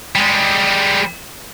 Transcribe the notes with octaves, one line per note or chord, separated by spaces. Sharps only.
G3 G#3